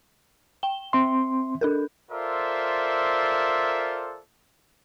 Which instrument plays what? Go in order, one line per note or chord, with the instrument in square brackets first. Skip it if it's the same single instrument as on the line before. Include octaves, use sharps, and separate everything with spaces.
[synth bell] G5 G7
[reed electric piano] C4 C6 [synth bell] E5
[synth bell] D4 A4 A#4
[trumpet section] F4 A4 A#4 C5 D5 E5